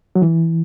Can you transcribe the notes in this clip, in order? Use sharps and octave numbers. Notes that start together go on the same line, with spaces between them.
F#3
E3